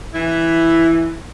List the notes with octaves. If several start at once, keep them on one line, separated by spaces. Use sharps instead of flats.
E3 E4